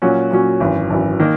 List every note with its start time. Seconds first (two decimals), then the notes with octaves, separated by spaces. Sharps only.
0.02 A#2 F#3 C#4 F#4
0.31 A#2 F#3 C#4 F#4
0.60 G#1 F#2 E3
0.90 G#1 F#2 E3
1.20 D#3 A#3